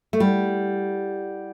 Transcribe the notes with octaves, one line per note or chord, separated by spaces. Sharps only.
A3
G3 E4 G4 D5 F#5